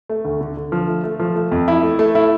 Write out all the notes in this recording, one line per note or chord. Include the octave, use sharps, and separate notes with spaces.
A3
D2
D3
D3
F3
A3
A3
F3
A3
F2
E4
A3
A3
E4